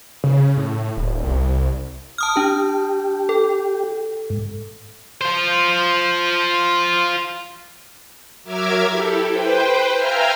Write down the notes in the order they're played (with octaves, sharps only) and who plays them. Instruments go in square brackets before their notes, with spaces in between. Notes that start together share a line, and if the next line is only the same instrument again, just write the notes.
[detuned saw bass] C#3
A2
D#1
C2
[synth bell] A5 D#6 F6
[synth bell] D4 A5 [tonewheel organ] G4
[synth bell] A4
[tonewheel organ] G#2
[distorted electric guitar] F4 C5
[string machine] F#3 A#4 E5 D6 F6 G#6
E4 G4 A4
B4 C5 G5
E5 F5 G5 G#5 A#5 F6